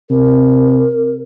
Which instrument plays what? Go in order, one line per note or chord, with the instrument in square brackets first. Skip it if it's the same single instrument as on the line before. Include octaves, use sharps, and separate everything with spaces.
[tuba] C3 [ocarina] A#4